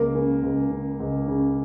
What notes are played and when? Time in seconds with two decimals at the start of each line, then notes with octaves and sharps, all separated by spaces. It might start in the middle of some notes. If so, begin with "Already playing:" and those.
Already playing: C#2 A#3
0.15 C#3
0.43 C#2
0.71 C#3
1.00 C#2
1.28 C#3